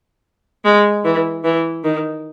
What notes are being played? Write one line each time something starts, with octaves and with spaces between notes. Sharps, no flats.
G#3
E3
E3
D#3